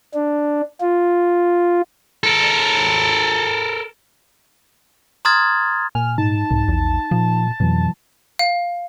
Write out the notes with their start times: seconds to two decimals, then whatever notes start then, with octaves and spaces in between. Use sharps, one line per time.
0.14 D4
0.81 F4
2.23 A4 A#4
5.25 A#5 C6 D#6 F6 G#6 A6
5.95 A#2 G#5 F6
6.18 G#2 D#4 A5
6.51 C2 G#2
6.68 A#1 E2
7.11 A#2 F3
7.60 F2 B2 E3 F#3
8.39 F5